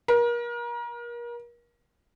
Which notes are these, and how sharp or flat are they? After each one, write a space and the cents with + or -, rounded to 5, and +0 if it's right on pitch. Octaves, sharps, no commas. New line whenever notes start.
A#4 +35